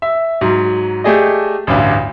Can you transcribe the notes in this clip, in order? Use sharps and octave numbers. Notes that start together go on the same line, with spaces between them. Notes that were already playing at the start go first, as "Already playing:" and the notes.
E5
G#2 F#3
A3 G4 G#4 D5 D#5
A1 D2 G2